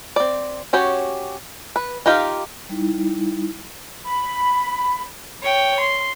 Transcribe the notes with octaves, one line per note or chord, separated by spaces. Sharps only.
C4 D5
C#4 F#4 G4 C#5
B4
D#4 F4 G4 A#4 F5
G3 D#4 E4
B5
C#5 G5
C6